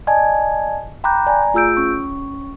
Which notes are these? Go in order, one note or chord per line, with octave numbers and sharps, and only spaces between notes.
D5 D#5 G#5 A5 G#6
G5 A#5 B5 D6 F#6 G6
D5 G#5 A#5
A3 F4 G#4 E6 G6 D7
C#4 C#6